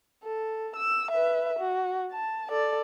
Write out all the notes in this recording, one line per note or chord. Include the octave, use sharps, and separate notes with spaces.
A4
E6
B4 E5
F#4
A5
A4 D5